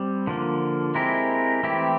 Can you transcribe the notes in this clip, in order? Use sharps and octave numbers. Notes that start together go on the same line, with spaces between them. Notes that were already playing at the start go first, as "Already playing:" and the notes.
Already playing: G3 C4
D3 F3 A#3
G#3 C4 E4 G4 A#4
E3 A3 C4 E4 G4